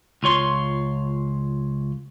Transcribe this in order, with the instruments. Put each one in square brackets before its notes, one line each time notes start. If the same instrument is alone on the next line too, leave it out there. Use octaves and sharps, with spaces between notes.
[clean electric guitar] C#2 F4 C#5 C6